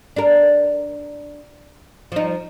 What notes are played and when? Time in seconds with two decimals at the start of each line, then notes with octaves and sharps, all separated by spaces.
0.16 D4 A#4
2.12 F3 D#4